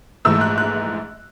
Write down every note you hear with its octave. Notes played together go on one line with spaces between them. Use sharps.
A#1 G#2 E3 A3 E6
F#6
F#6